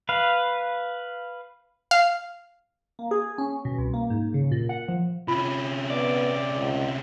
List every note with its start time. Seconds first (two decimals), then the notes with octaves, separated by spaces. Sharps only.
0.09 B4 F5
1.91 F5
2.99 A#3
3.11 G#4
3.38 C#4
3.65 B2
3.78 C2
3.94 A#3
4.10 G#2
4.34 C#3
4.51 A#2
4.69 F#5
4.88 F3
5.28 C3 C#4 F4
5.90 B3 D5
6.53 C#2